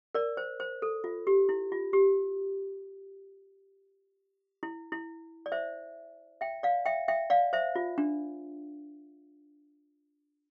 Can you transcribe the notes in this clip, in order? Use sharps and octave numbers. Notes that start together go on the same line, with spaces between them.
A#4 D5
C5
C5
A4
F4
G4
E4
F4
G4
E4
E4
D5
C5 E5
E5 G5
D5 F5
E5 G5
E5 G5
D5 F5
C5 E5
F4
D4